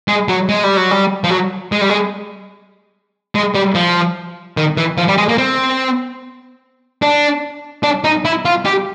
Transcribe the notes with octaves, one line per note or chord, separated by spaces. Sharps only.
G#3
F#3
G#3
G3
F#3
G3
F3
F#3
G#3
G3
G#3
G#3
G3
F3
D#3
E3
F3
G3
G#3
A#3
C4
D4
D4
D#4
E4
F4
G4